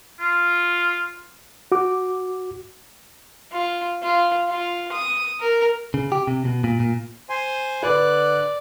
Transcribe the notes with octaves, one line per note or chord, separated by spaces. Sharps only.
F4
F#4 D6
F4
F4
F4
D#6
A#4
C#3
G4
C3
B2
A#2
A#2
C5 G#5 C6
D3 B4 D5 F#6